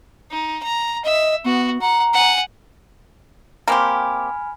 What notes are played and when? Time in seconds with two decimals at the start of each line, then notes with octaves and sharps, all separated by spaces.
0.30 D#4
0.62 A#5
1.04 D#5 E5
1.45 B3 F#4
1.81 F#5 A#5
2.13 F#5 G#5
3.68 A#3 C4 G4 G#5 B5 F6